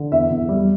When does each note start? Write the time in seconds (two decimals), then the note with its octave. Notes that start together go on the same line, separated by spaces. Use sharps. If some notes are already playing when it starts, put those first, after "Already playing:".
Already playing: D3
0.12 E2 E5
0.31 E2
0.49 G3